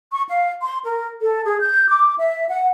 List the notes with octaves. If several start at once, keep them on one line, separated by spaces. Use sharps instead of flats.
C#6
F5
C6
A#4
A4
G#4
G6
D6
E5
F#5